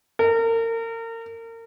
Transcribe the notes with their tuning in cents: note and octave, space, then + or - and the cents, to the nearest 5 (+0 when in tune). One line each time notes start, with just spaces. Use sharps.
A#4 -35